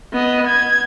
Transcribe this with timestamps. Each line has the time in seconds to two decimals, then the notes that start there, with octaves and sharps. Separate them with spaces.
0.13 B3 D#5
0.47 G#6